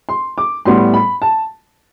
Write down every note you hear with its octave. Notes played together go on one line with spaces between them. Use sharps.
C6
D6
A2 G3 B3 C6
B5
A5